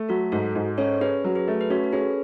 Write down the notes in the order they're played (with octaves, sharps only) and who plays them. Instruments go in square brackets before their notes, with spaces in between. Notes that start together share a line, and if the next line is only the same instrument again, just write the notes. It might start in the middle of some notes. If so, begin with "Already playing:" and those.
Already playing: [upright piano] A3
[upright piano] F#3 [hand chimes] F#4 A4
[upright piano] G#2 [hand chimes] F#4 A4
[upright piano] G#2
[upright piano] C#4 [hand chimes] A4 C#5
[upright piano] C#4 [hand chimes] G#4 B4
[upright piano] F#3
[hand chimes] G#4 B4
[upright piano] A3
[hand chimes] B4
[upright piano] C#4 [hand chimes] F#4 A4
[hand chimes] A4
[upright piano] C#4 [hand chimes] G#4 B4